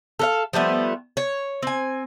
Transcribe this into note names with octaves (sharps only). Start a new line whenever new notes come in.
A4 A#4 F5
F3 G3 A3 B3
C#5
C4 G#5